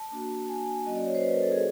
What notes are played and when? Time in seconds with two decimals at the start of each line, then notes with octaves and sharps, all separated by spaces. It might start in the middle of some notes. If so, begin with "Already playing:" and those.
Already playing: A5
0.12 A#3 D4 F#4
0.49 G#5
0.86 F#3 A#3 C#4 F#4 D#5
0.95 D5
1.05 C#5
1.15 C5
1.23 B4
1.34 A#4
1.43 A4
1.52 G#4